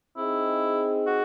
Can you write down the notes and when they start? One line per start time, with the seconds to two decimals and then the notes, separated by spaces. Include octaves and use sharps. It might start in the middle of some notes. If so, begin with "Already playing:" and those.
0.17 C4 D#4 E4 G#4 D#5
1.07 F#4